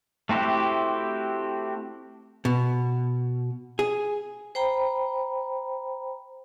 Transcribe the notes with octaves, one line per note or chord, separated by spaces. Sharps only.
A3 C4 E4 F#4 G4
B2
G#4
C5 G5 A#5 B5